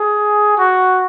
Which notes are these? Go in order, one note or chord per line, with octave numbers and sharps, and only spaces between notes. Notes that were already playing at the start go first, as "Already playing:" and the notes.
Already playing: G#4
F#4